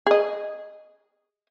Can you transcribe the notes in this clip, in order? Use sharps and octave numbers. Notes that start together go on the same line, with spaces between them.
G#4 D#5